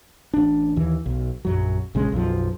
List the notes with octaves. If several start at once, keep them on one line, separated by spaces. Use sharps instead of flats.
A1 D4
D#2 E3
B1
A#1 F#2 F#3
A#1 C#3 G#3
B1 F#2 F3